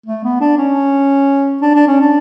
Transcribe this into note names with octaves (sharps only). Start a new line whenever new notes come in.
A3
B3
D4
C#4
D4
D4
C#4
D4